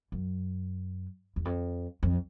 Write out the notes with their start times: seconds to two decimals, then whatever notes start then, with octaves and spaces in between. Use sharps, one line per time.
0.12 F#2
1.36 E2
1.45 F2
2.03 F2